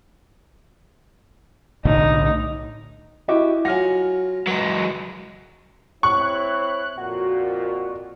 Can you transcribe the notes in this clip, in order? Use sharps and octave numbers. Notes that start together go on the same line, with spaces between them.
B1 A2 D3 D#4
E4 F#4 G4 D#5 E5
F#3 F4 F#5 G#5 F6 A#6
F#3 G#3 B4
C4 E4 C#5 C#6 F#6
F2 A#2 F#4